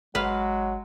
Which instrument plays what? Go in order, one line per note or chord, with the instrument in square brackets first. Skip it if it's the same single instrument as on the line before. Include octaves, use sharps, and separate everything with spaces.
[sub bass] G#1 [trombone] F#3 [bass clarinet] G#3 [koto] B4 F5